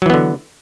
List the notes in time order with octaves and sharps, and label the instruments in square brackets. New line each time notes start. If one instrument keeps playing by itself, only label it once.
[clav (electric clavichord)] F#3
E3
B3
D3